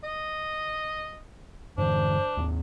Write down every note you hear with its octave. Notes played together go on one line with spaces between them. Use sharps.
D#5
G2 D3 E3 D4 C5
D#2 A3 C4